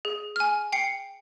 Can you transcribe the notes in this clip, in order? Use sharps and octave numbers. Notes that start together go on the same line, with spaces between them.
G#4
G#5 F6
G5 C7 C#7